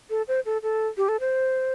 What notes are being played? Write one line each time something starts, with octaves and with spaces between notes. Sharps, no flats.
A4
C5
A4
A4
G4
A4
C5